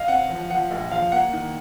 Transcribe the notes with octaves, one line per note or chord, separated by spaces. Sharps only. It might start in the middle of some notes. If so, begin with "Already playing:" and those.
Already playing: D#5 F5
C4 F#5
F3
F3 F#5
A#1
F3 F5
A#3 F#5
D#3